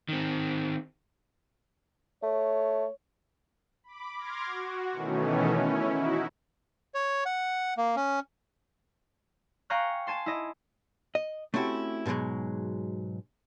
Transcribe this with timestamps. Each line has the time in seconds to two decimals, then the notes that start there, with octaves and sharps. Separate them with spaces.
0.09 D#3 C4
2.23 A3 C#5
3.84 B5 D6
4.16 C6 D6 F6 G#6 A#6
4.46 F#4
4.92 B2 D#3 E3 A3 C#4
5.53 C#4 E4
5.88 D#4 E4 F#4
6.94 C#5
7.26 F#5
7.77 A#3
7.96 C#4
9.70 F5 G5 G#5 A#5 C#6 F#6
10.07 G#5 A5 C6
10.26 E4 D#5
11.15 D#5
11.54 A3 C4 C#4 E4 F#4 G4
12.06 G#2 B2 F3 F#3 G#3